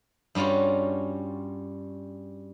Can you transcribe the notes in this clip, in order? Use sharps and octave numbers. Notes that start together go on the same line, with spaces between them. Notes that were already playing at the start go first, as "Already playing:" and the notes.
G2 G3 C#4 F4 F#4